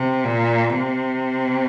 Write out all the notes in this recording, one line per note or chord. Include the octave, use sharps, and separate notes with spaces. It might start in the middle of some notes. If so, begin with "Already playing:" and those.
Already playing: C3
A#2
C3